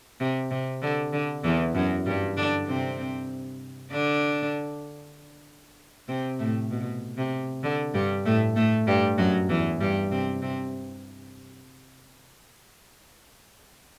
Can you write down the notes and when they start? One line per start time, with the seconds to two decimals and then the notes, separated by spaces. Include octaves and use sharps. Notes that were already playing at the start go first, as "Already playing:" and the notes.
0.20 C3
0.51 C3
0.82 D3
1.13 D3
1.44 E2 E3
1.75 F#2 F#3
2.06 G2 G3
2.37 D3 D4
2.68 C3 C4
3.91 D3 D4
6.08 C3 C4
6.39 A2 A3
6.71 B2
7.17 C3
7.63 D3
7.94 G2 G3
8.25 A2 A3
8.56 A2 A3
8.87 G2 G3
9.18 F#2 F#3
9.49 E2 E3
9.80 G2 G3
10.11 C3 C4
10.42 C3 C4